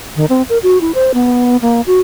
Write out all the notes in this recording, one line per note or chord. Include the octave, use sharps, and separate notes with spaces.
D#3
C4
A#4
F#4
E4
C5
B3
A#3
F#4